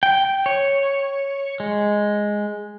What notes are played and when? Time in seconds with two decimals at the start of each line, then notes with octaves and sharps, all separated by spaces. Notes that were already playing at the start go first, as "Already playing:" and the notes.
0.03 G5
0.46 C#5
1.60 G#3